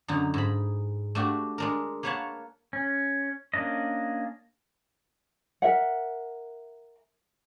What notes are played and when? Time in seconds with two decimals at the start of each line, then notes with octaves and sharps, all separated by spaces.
0.08 F#2 D3 D#4
0.34 G#2 B5
1.15 A3 D4 F#4 G4
1.58 G#3 D4 A#4
2.03 A#3 B4 C#5 F5 F#5 A5
2.73 C#4
3.54 A#3 C#4 D4 D#5
5.62 A#4 E5 F#5